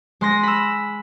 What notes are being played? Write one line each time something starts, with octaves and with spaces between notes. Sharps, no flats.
G#3 C6 A#6
B5 E6